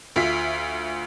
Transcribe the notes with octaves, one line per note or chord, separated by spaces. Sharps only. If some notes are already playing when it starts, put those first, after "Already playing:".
D2 F4 E5 B6